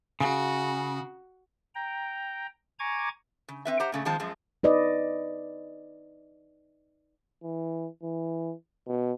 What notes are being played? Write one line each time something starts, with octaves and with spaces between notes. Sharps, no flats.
C#3 F#4
G5 A#5
G#5 A#5 C#6 D6 G#6
C#3
C4 B4 E5
G4 C5 F#5 A#5
A#2 C#3 A3
D#3 F3 G#3 C4 F4 A5
F#2 F3 G#3 F4
D#4 B4 D5 D#5
E3
E3
B2